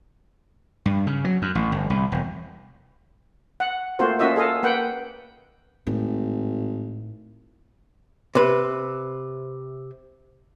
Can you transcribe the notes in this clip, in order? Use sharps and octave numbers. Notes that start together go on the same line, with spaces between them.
G2
C#3
F#3
F#2
A1
G1
C2
E1
F#5
A3 A#3 C4 F4 F#4 C5
A#3 C#4 F4 F#4 D#5 E5
G#4 A4 D#5 F5
A#3 B4 F#5 G5
G#1 A2
C3 B4